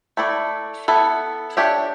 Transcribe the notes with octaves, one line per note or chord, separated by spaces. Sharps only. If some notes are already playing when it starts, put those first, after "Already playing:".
A3 E4 A4 D5
B3 E4 A4
D4 G4 C#5 E5